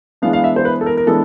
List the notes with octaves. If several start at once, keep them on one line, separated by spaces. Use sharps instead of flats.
E3 G#3 B3 D4 F5
F5
E5
C5
B4
A4
A#4
A#4
E3 G#3 B3 D4 A4